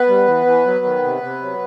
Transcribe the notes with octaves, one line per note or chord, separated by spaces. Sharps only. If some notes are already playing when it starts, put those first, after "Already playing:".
Already playing: B3 B4
G3
E3
E3
F#3
D#3
C3
C3
F#3